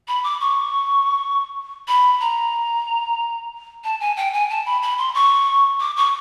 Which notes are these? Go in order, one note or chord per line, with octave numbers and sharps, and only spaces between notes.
B5
D6
C#6
B5
A#5
A5
G#5
G5
G#5
A5
B5
B5
C6
C#6
D6
C#6